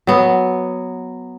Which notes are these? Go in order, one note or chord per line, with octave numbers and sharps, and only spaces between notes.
F#3 B3